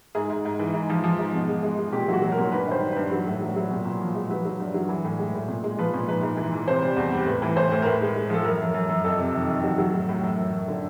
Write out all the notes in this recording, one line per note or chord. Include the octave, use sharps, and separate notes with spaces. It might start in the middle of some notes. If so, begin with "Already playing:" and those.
G#2 G#4
G#2
G#2
E3
G#2
F3
F3
G#2
B2
G#3
G#3
G#3
A#2 G4
F#3 F#4
F#3
A#4
A#2
G2 B4
D#3 C5
G2
G2 B4
F#3
A2
F#3
F#3
A#2
A#2
F3
G#3
F#3 B4
F#3
G2
F#3
E3
A2
G#3
A2
A#2
G#3
F3 B4
A#2
G#2 B4
G#2
E3
E3
C3 C5
G3
E2
G3
A2 B4
E3
A2 C5
A2
A#4
A2 B4
G#3
G#3
F3 A4
F#2 A#4
F#2
F#2
F#2
F2 A4
C3
D#3
D#3
F#3
F#3
A2
A2
F#2
F#2
F#2
D3